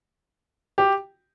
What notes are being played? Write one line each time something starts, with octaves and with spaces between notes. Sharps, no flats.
G4